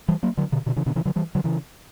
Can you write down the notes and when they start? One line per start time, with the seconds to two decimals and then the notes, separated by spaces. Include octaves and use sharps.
0.08 E3 G3
0.23 F#3 A#3
0.37 D3 F#3
0.52 B2 D3
0.66 B2 D3
0.76 C#3 E3
0.86 B2 D3
0.96 C#3 E3
1.05 D3 F#3
1.16 E3 G3
1.35 D3 F#3
1.44 C#3 E3